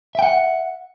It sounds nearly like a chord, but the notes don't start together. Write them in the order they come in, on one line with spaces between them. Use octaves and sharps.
E5 G5 F#5